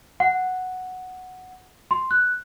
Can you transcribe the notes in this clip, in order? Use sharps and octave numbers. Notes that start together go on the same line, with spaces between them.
F#5
C6
F#6